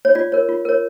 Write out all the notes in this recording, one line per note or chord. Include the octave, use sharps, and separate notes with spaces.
C#5
F4 D5
A#4 C#5
F4
A#4 C#5